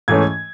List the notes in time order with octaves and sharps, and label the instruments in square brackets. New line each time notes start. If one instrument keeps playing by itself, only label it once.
[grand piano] G#2 E3 A3 C#4 G#6